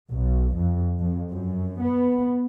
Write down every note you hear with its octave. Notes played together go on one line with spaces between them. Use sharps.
B1
F2
F2
F#2
B3